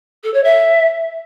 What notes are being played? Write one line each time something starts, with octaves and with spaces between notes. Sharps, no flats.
A4
C#5
E5